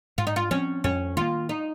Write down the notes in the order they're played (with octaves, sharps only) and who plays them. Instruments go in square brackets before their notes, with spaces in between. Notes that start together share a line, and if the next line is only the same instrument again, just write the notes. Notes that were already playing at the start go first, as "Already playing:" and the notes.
[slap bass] G#2 [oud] F4
[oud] D#4
F4
[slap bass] F3 C4 [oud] C#4
[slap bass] F2 [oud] C#4
[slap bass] D#3 A#3 [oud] F4
[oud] D#4